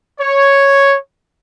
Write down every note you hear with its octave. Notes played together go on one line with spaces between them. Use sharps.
C#5